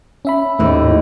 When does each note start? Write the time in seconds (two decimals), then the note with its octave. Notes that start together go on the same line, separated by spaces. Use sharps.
0.25 C#4 E5 B5
0.59 G#1 D#2 A2